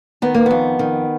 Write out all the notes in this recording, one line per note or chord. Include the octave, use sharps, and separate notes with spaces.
D#3 B3
A#3
F2 B3
D#3